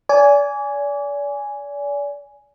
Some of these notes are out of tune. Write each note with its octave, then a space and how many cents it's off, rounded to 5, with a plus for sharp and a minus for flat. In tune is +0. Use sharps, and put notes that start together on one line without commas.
D5 -35 G#5 +0